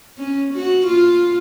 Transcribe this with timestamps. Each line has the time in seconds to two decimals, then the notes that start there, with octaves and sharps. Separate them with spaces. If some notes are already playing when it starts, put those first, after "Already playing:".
0.18 C#4
0.54 F#4
0.87 F4